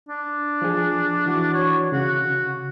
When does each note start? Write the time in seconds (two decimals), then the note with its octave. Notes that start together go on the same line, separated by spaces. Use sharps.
0.09 D4
0.62 F3 G#4
1.26 E3 F#4
1.53 C#5
1.92 C#3 F#4